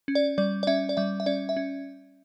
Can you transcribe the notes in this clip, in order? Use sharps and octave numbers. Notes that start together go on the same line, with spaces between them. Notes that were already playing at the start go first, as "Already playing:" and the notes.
C#4
D5
G3 D5
D5
C#4 E5
D5
G3 E5
E5
C#4 D5
E5
C#4